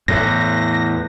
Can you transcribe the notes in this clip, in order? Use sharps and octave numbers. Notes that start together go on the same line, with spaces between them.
E2 A2 A#6